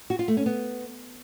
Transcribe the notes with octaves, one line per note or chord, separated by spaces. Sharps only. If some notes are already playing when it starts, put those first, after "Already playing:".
F#4
F4
A3
C#4
B3